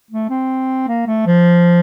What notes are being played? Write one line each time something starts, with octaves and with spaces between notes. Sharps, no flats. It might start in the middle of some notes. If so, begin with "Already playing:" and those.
A3
C4
A#3
A3
F3